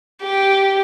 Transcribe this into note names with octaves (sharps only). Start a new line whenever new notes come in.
G4